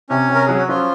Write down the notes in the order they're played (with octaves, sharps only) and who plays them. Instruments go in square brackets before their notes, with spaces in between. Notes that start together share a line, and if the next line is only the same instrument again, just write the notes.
[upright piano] C3 [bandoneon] C#4 C#5
[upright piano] C3
[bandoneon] A#4
[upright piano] F#3 [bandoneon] G#4
[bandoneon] F#4
[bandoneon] F3 F4 [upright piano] C#4